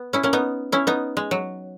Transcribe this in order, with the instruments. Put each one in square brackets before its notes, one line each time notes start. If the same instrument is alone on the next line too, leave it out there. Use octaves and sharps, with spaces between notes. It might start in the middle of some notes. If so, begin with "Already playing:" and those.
Already playing: [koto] B3
C#4 E4
A#3 C#4
B3 D#4
C#4 E4
B3 D#4
G#3
F#3